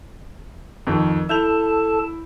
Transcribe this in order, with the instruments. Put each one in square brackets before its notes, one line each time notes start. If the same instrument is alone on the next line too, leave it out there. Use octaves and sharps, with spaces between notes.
[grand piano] F2 D#3
[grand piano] E4 G6 F7 [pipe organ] A4 A5